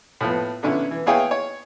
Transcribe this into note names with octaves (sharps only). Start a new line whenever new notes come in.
A2 F3 B3
A#2 D3 B3 C#4 E4
E3
B3 E4 G#4 C#5 F5 G5
C#5